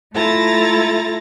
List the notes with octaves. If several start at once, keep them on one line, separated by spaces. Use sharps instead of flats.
A3 E4 F4 A4 A#5 A6